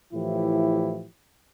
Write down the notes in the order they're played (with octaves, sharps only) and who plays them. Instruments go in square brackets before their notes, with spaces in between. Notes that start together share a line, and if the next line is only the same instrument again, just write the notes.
[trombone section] A2 E3 F3 E4 G4